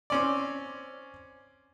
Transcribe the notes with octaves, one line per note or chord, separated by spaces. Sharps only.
C4 C#4 D5